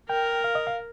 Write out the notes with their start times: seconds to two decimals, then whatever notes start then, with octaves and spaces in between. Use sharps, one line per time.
0.09 A#4 G5
0.44 F5
0.55 D#5
0.67 F5